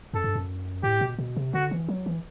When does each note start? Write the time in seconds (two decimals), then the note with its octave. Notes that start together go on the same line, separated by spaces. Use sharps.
0.13 F#2 A4
0.24 G2
0.35 F#2
0.83 A2 G4
1.01 B2
1.18 B2
1.36 C3
1.53 D3 F#4
1.71 E3
1.88 F#3
2.06 E3